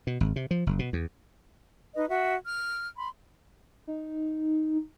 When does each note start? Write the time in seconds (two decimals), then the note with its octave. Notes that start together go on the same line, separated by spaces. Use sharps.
0.07 B2
0.21 G#1
0.36 C3
0.51 F3
0.67 F#1
0.79 B2
0.93 E2
1.95 D#4 B4 D#5
2.09 F#4 E5
2.47 F6
2.97 B5 C6
3.87 D#4